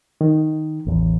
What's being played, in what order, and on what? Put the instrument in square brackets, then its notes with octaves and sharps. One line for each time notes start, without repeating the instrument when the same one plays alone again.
[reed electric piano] D#3
[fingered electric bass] A1 E2